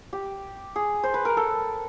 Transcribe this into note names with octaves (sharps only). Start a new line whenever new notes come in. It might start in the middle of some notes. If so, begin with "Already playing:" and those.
G4
G#4
C5
B4
A#4
A4